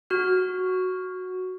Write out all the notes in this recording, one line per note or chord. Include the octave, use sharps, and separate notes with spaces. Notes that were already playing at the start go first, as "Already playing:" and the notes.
F#4 F6